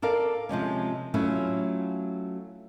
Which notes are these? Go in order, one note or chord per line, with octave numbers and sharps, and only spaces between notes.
A4 A#4 D5 F5
C3 F3 G#3 C#4
F#3 A3 C#4 E4 F4